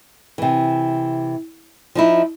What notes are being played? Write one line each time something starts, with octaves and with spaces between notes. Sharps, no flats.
C3 E3
F3 D#4 E4